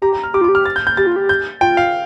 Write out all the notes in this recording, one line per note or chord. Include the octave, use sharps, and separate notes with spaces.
G4 A#5
A#5
F6
G4 D6
F4
D6
G4
F6
A6
G6
G6
G4 A6
F4
G4
G6
F4 G5
F5